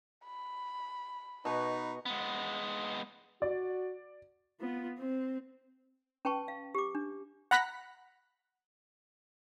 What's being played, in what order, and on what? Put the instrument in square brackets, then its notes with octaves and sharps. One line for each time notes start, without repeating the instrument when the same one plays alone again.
[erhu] B5
[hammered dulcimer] B2 [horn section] D#4 B4 [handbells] D#5 C#6
[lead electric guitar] G#3 B3
[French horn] F#4 [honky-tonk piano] D5
[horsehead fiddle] B3 F4
C4
[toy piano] C#4 B4 G5 A5 C#6
F5
G4 D6
D4
[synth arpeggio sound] F#5 A#5 B5 F#6 A#6 B6